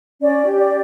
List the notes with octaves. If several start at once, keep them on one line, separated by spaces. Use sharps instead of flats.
C#4 D5
G4
D5